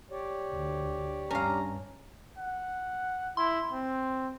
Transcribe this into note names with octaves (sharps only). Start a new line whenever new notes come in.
G4 C#5 D5
D2
G2 C#4 F5 A#5
F#5
E4 C6
C4